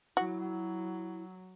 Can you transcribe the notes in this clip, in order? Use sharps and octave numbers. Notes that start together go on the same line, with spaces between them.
F#3 E4 F#4